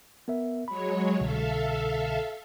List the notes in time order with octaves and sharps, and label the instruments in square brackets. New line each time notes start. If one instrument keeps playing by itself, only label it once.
[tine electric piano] B3 A#4 E5
[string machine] F#3 G#3 C#5 [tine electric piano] B5
[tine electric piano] C2 B2 D3 [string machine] A4 E5 F5